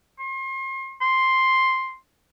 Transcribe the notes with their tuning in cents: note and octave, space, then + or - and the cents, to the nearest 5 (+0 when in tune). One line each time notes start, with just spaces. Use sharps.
C6 +40
C6 +5